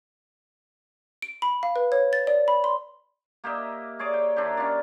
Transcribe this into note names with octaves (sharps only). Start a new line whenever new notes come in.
D7
B5
F5
B4
C#5
A6
D5
B5
C6
A#3 G4 D#5 E5
G#4 C#5 D5 D6
G5
D#3 D4 E4 G4
C#4 F4 D5